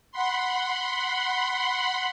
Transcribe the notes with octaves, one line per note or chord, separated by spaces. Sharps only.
F#5 B5 C6